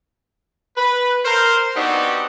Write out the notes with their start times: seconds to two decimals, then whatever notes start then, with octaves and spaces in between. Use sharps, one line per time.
0.78 B4
1.25 A#4 C5
1.77 B3 C4 D4 D#4 F#4 G4